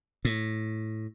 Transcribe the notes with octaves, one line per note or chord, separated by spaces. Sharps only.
A2